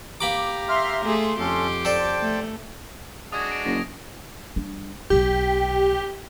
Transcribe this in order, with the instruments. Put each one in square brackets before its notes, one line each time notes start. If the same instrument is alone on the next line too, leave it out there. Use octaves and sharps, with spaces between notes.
[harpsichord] A#3 B5 D6 [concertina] G4 A#5
[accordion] E5 C6 F6
[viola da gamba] A3 G#4 [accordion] C6
[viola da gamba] F2 G4 [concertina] C#4 A4
[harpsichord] A4 D5 [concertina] C5 G5 A5
[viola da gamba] A3
[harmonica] G#3 D4 F#4 [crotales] D#6 G#6
[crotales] D7
[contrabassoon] F#1 [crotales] A6 A#6
[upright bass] G3 D4
[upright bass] B1 F#3 [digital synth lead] G4